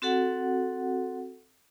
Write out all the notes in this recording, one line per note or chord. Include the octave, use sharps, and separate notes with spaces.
C4 F#4 A4 F#5